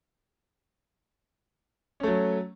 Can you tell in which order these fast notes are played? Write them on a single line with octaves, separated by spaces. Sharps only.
C#4 A3 F#3